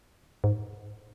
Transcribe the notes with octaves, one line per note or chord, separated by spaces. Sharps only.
G#2